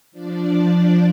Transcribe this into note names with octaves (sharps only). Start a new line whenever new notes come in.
F3 D4 D5